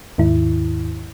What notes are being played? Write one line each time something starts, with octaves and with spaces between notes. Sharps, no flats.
D#2 G#2 D#3 E4